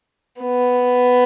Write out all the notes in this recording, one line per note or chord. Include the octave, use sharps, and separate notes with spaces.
B3